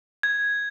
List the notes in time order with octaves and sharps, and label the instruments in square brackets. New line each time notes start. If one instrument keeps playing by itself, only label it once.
[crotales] G#6